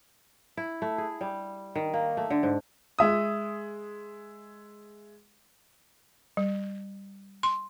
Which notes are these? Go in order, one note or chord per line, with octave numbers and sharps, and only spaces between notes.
E4
A3
G#4
G3
D#3
A#3
A3
D3
G#2
G#3 E5 D#6
G3
C6